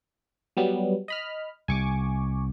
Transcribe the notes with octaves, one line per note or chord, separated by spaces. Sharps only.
F#3 G3 B3
D#5 B5 F6
C2 G#5 C#6 D6